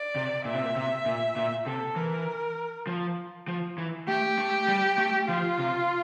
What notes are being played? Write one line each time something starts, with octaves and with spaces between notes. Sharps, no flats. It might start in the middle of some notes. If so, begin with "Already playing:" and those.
Already playing: D5
C3
A#2 E5
C3
A#2
C3
A#2
A#2
C3 A4
E3 A#4
F3
F3
E3
A3 G4
A3
G3
A3
F3 F4
C3